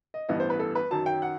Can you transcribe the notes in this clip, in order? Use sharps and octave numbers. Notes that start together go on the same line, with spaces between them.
D#5
A1 G2 E3 B3 D#5
C5
B4
A4
B4
F#2 D#3 F#3 A5
G5
F#5